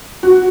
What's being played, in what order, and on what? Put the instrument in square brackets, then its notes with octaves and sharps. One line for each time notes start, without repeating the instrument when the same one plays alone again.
[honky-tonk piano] F#4